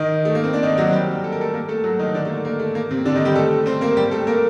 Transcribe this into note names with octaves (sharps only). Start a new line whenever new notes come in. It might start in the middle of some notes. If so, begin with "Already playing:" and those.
Already playing: D#3 D#4
A3
A#3
C4
D4
D#3 D#4
F#3 F#4
G3 G4
A4
A#4
A3 A4
A#3 A#4
A3 A4
F#3 F#4
D#3 D#4
D3 D4
A3
A#3
A#3
A3
A#3
C3 C4
D3 D4
D#3 D#4
G3 G4
A3 A4
C4 C5
A#3 A#4
G3 G4
A3 A4
A#3 A#4